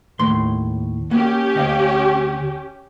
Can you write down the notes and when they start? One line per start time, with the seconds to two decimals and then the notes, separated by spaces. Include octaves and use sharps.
0.19 D#2 A2 C6
1.11 A#3 C#4 G4
1.55 D2 D#5 F5